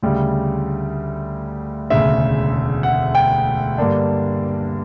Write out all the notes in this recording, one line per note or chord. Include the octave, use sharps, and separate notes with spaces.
D2 C#3 G3
E1 D2 C#3 E5
F#5
G5
G2 D3 A#3 D4